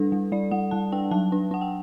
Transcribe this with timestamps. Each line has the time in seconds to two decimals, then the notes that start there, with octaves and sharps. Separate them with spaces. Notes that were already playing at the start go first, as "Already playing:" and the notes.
Already playing: G3 D4 A4
0.12 G3
0.32 G3 D5
0.51 G3 F#5
0.71 G3 A5
0.92 D4 G5
1.11 F#3 A5
1.32 D4
1.51 D4 F#5
1.61 G5